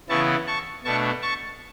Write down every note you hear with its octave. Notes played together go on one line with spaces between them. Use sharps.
C#3 E3 B3 E4 A5 C#6
A5 C#6
B2 A3 D4 A5 C#6
A5 C#6